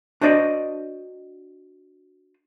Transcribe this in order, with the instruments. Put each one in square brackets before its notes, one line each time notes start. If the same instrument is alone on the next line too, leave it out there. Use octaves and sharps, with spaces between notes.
[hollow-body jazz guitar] D4 F#4 C5 D5 D#5